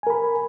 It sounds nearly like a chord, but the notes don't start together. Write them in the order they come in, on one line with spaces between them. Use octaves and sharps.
G#5 A#4 B5